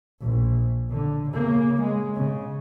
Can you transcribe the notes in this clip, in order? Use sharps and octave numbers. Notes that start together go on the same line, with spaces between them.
A#1
D3
C#3 A#3
G#3
C#3